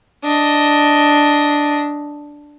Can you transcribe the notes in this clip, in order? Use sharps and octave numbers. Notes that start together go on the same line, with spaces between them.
D4 D#5